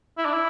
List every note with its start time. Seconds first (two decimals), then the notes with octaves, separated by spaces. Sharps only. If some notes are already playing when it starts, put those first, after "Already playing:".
0.18 E4
0.25 D4
0.33 E4